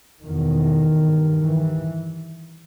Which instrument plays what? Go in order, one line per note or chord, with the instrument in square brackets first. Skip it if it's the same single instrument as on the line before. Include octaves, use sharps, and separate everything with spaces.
[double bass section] E2 B2 D#3
G2
E3